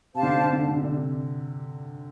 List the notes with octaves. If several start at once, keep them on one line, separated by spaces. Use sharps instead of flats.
C3 G4 C5 F5 A5
D3
C3
D3
C3
D3
C3
D3
C3
D3
C3